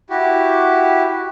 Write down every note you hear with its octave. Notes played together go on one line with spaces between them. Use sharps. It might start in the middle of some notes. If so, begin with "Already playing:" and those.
E4 F#4 G4